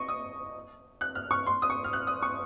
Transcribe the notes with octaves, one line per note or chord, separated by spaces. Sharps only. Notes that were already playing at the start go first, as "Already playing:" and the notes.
Already playing: D#5 C#6
D#6
F#6
F6
C#6
C6
D#6
C#6
F6
F#6
D#6
C#6